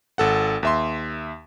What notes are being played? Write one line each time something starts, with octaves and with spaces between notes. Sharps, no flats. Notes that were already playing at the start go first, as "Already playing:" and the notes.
G#1 A4 F#5
D#2 E5 C6